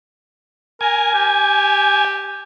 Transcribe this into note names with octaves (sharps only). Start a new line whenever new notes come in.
A#4 G#5
G4